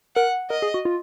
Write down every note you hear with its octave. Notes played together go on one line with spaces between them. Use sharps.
A#4 F#5
A#4 D#5
G#4
F#4
F4